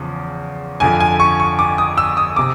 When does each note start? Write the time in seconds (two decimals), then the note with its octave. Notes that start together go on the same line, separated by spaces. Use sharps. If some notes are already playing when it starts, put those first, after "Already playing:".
Already playing: E2 C#3 F3
0.80 F2 D3 F3 G#5
1.00 G#5
1.20 C#6
1.40 C#6
1.59 D6
1.78 D#6
1.98 E6
2.17 D#6
2.36 C3 D6